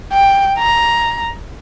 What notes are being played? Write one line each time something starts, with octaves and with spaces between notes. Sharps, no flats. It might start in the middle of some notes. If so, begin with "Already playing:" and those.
G5
A#5